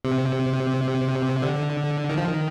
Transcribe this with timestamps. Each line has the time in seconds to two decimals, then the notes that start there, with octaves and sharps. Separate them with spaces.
0.05 C3
1.42 D3
2.09 D#3
2.18 F3
2.27 D#3